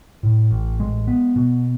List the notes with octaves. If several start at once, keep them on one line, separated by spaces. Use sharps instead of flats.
A2
A1
G#3
B3
B2